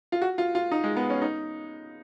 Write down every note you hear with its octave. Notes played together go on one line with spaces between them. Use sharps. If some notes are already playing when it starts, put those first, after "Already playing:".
F4
F#4
F4
F4
D#4
G#3
B3
C#4
D#4